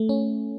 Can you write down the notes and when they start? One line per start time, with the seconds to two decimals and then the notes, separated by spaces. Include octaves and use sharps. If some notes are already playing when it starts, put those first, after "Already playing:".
Already playing: A3
0.09 C#4